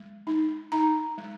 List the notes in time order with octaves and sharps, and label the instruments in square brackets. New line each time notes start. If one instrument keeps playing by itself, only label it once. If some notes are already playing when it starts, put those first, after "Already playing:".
Already playing: [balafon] G#3
D#4
D#4 A#5
G#3